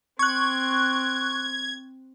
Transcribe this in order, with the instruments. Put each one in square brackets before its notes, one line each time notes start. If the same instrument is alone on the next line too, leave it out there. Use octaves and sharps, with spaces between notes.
[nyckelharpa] C4 [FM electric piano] C#6 F#6 [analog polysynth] G#6